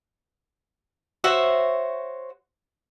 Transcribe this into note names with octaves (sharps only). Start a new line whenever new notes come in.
F#4 C5 C#5 E5